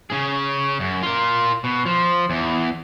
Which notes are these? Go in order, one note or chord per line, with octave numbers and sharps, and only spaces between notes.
C#3 G#4
F#2
F4 A#4
B2
F3
E2